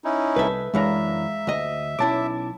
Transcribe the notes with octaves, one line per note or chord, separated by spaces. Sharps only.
C#4 D#4 E4
C2 A4 B4 E5
F#2 E3 G#3 D4 E5 F5 A#5
D2 D#5
B1 C#4 E4 A5 D6